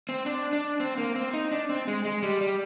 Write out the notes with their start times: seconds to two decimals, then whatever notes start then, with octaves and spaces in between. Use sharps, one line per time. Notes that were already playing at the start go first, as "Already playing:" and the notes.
0.09 C4
0.26 D4
0.53 D4
0.80 C4
0.98 A#3
1.16 C4
1.34 D#4
1.52 D4
1.69 C4
1.87 G#3
2.05 G#3
2.23 G3
2.41 G3